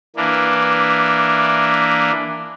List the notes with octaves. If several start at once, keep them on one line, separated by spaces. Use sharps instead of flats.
E3 A#3 D4